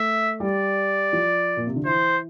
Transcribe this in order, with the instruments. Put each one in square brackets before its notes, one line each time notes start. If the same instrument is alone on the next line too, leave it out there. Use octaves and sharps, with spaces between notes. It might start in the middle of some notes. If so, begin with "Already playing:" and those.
Already playing: [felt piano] A3 [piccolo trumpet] E5
[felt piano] G3 [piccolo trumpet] D5
[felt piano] F3
A#2
C3
D3
[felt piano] E3 [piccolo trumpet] C5